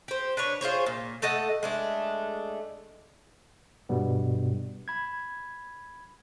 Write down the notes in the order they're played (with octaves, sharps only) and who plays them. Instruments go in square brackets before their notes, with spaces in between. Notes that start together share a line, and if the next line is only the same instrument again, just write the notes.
[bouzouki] G4 C5
D4 B4 C#5
F4 G#4 C5 C#5
A#2
A3 A4 D#5 F#5
G#3 A3 D4
[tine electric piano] G2 B2 G3 B3
B5 G#6